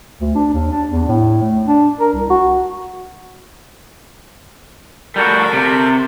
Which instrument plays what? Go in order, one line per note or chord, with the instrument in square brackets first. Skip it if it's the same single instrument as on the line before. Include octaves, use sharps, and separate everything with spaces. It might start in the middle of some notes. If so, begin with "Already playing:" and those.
[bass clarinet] D2
D4
D#2
D4
E2
A2
A3
D4
A#4
C2
F#4
[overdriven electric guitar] G3 F#4 [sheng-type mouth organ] A4 A#4
[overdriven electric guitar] C3